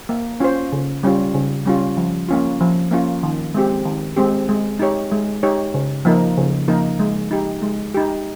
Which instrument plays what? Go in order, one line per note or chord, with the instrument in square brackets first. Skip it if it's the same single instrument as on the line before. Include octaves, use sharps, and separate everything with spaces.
[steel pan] A#3
C#4 F4 C5
C#3
G3 C#4 F4
C#3
G3 C#4 F4
F3
A#3 C#4 F4
F3
A#3 C#4 F4
D#3
G#3 C4 G4
D#3
G#3 C4 G4
G#3
D#4 G4 C#5
G#3
D#4 G4 C#5
C#3
F3 A#3 D#4 A#4
C#3
F3 A#3 D#4 A#4
G#3
D#4 G4
G#3
D#4 G4